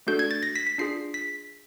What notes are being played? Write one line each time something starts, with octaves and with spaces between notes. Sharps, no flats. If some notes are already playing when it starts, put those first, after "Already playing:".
A3 D4 F#4 A4 G6
G#6
A6
A#6
B6
B6
D4 F4 G#4 C7
B6